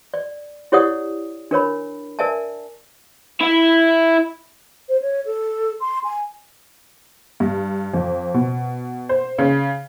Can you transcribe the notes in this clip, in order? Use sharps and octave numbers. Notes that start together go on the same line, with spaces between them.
D5
E4 G4 C#5 D5 F#5 D#6
D4 A#4 C#5 B5
A#4 D5 E5 G#5 A5
E4 E5
C5
C#5
A4
C6
G#5
G2
F2
B2
C5
C#3